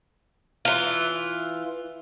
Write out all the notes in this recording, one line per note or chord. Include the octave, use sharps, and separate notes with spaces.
E3 F4